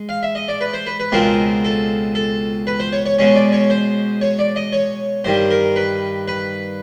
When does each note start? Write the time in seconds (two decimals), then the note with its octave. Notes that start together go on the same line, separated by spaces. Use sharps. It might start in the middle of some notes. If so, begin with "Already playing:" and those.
Already playing: G#3
0.09 F5
0.23 E5
0.35 D#5
0.48 D5
0.61 B4
0.74 C5
0.86 B4
1.00 B4
1.12 C#2 B2 G#3 C4 F4 A#4
1.64 A4
2.15 A4
2.67 B4
2.80 C5
2.93 C#5
3.06 C#5
3.19 B2 G#3 C#4 C#5
3.35 D5
3.52 C#5
3.70 C5
4.21 C#5
4.39 D5
4.56 D#5
4.73 C#5
5.24 G2 D#3 G3 C5
5.51 A#4
5.76 B4
6.28 B4